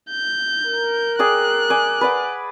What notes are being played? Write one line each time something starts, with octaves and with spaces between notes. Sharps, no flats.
G6
A#4
G#4 D5 G5 F#6
D5 G#5
B4 D5 F#5